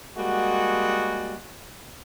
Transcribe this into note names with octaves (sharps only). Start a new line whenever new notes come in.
G3 G#3 A#3 F#4